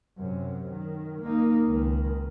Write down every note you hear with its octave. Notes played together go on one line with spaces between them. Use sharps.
F#2 C3
D#3
A#3 D#4
C#2 D#3